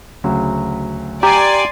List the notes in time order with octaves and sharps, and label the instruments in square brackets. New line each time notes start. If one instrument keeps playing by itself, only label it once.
[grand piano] D2 C#3 F#3
[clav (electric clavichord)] G4 [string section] D5 G#5 C6 [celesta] A#5